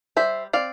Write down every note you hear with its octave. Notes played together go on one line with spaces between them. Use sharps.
G3 C5 E5
C4 D5 F5